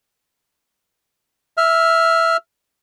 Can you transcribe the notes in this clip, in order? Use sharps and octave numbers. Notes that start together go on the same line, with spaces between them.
E5 F6